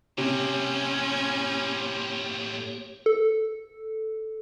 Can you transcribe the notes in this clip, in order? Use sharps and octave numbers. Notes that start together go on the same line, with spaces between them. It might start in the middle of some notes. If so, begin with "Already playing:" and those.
A2 C3 A#3 C4 C#4 G4 C#5
A4